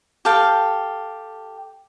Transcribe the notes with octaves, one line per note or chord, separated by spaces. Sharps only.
G4 A4 F5 G5